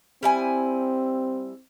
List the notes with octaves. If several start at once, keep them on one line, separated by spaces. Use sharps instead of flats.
G3 C4 E4 G#5